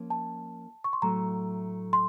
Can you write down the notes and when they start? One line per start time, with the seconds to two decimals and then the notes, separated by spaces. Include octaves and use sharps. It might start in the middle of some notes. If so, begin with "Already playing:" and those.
Already playing: F3 A#3 C#4
0.10 A5
0.84 C#6
0.93 C6
1.02 A2 F#3 A3 A#5
1.93 C6